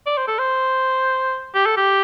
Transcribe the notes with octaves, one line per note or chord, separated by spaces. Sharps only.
D5
C5
A4
C5
G4
A4
G4